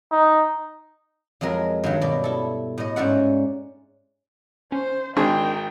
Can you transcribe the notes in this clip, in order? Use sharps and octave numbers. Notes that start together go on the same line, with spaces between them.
D#4
F2 F#3 G#3 A#4
G2 D#3 F#3
B2 D5
E4 A4
A2 D#5
G#2 C#4 D5 E5 F#5
C#4 C5
G#1 D4 G#4 A#4 G5